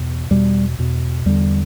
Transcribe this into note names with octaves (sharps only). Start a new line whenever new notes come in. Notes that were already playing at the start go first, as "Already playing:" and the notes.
Already playing: E2 B2
E2 B2 G3
E2 B2
E2 D3 G3